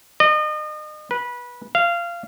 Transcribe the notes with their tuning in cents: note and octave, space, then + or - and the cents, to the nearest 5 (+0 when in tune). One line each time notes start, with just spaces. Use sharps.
D#5 -35
B4 -20
F5 -20